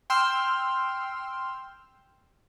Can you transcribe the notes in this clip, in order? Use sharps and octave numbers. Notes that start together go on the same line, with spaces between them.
G5 C6 E6 F6